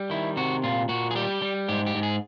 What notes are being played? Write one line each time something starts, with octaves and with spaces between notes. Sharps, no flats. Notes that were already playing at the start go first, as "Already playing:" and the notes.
Already playing: G3
D#3 E4
C3 F#4
A#2 F4
A#2 F#4
G#4
G3 G4
G3
G#2 G4
G4
G#2
G#4